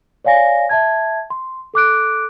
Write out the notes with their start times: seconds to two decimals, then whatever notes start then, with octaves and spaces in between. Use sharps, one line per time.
0.25 C#5 D5 F5 G#5 A#6
0.69 E5 A5 G#6
1.30 C6
1.74 A4 D6 F#6 D7